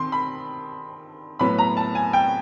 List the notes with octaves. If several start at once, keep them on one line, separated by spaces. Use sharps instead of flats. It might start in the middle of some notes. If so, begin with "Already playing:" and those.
Already playing: D#3 C4 C6
B5
A2 F#3 B3 B5
A#5
A5
G#5
G5